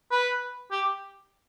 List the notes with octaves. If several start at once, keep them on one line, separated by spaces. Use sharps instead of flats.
B4
G4